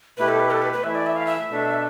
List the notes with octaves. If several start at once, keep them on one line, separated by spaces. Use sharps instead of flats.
B2 A3 E4 G4 B4
A4
B4
A4
B4
B4
E3 A3 E4 E5
D5
E5
F5
E5
B2 A3 D4 A4